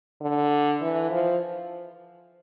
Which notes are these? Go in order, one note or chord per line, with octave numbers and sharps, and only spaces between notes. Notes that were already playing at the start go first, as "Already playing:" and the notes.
D3
E3
F3